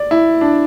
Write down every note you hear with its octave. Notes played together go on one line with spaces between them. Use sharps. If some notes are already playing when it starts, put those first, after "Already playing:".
Already playing: D5
E4
D4